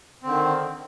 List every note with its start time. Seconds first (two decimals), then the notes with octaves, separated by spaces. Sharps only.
0.23 C4
0.26 D3
0.29 D#3